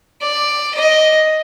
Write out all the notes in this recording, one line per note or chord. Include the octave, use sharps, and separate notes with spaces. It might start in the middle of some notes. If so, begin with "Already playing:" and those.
D5
D#5